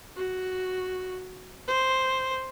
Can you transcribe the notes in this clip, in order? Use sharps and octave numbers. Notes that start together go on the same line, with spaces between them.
F#4
C5